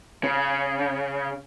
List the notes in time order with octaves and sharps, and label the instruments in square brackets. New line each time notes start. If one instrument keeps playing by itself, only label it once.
[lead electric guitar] C#3